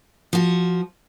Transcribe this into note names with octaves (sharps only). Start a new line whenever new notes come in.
F3 F#4